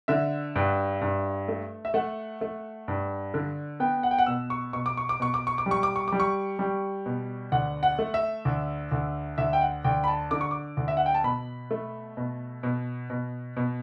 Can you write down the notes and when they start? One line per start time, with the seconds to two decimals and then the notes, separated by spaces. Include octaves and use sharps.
0.08 D3 E5
0.56 G2
1.01 G2
1.48 A3
1.85 E5
1.94 A3 F#5
2.41 A3
2.88 G2
3.34 D3
3.80 B3 G5
4.03 F#5
4.11 G5
4.19 F#5
4.26 B2 E6
4.50 C#6
4.73 B2 C#6
4.86 D6
4.97 C#6
5.09 D6
5.20 B2 C#6
5.34 D6
5.47 C#6
5.58 D6
5.66 G3
5.71 C#6
5.83 D6
5.96 C#6
6.08 G3 D6
6.20 C#6
6.59 G3
7.06 B2
7.52 D2 F#5
7.83 F#5
7.99 A3
8.14 E5
8.45 D2
8.92 D2
9.38 D2 E5
9.53 G5
9.61 F#5
9.84 D2 G5
10.04 B5
10.08 A5
10.31 D3 D6
10.41 C#6
10.51 D6
10.77 D2
10.88 E5
10.97 F#5
11.06 G5
11.14 A5
11.24 B2 B5
11.71 A3
12.17 B2
12.63 B2
13.10 B2
13.57 B2